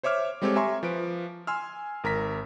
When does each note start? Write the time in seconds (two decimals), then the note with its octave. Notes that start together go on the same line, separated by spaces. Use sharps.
0.03 C5 C#5 E5 D6 F6
0.42 G3 G#3 C4 G4 A4 C#5
0.56 E5 G#5 A#5 C6 C#6
0.83 F3 B4 D7
1.47 G#5 C6 E6 F6
2.04 G#1 A#4 A#5 B6